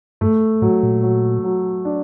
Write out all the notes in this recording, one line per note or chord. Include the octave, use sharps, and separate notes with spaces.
G2 A3
A2 F#3
A#2
F#3
F#3
D4